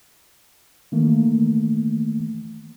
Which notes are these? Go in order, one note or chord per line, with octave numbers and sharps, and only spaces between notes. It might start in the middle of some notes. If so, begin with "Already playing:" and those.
D#3 E3 A3 A#3